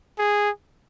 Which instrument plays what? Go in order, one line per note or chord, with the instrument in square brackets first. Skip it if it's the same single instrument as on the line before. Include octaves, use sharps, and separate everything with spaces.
[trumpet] G#4